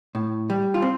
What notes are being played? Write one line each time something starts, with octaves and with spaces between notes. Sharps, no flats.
A2
G3
F4
C4